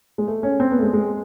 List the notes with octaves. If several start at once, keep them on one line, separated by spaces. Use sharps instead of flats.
G#3
A3
C#4
C4
B3
A3
G#3
G#3